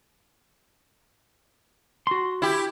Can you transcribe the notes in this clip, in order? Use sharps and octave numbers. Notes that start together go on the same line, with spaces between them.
F#4 C6
E4 G4